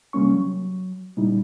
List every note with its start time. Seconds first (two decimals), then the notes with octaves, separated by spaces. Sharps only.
0.13 C3 G3 A#3 C#4 C#6
0.33 F#3
1.17 A#2 C#3 G3 D#4 E4